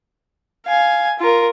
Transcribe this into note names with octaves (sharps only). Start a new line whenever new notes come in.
F5 G#5
F4 A#4